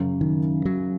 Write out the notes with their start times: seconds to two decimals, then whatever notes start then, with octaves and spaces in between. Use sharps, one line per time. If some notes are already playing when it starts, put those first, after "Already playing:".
Already playing: F#2 C#3 F#3
0.21 D#3
0.65 F#3